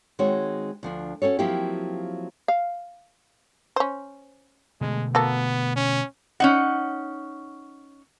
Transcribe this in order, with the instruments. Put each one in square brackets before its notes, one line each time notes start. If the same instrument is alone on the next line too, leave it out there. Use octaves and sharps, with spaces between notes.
[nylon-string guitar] D#3 G#3 C4 F#4 C#5
D2 F3 D4
C#4 F#4 A4 C#5
F3 F#3 A#3 C4 E4 G4
[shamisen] F5
C#4 C5
[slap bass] B2 D3 A3 [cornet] G#3
[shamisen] A#3 F#4 A4 [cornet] B3
[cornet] C#4
[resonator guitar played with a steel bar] C#4 D#4 F#5